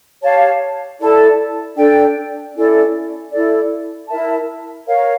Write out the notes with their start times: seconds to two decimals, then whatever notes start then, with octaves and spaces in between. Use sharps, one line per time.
0.22 G4 C#5 F5 A5
0.99 E4 A4 D5 A5
1.76 D4 A4 D5 G5
2.55 C#4 E4 A4 D5
3.32 E4 A4 D5
4.09 E4 A#4 E5 A5
4.87 A#4 C#5 F5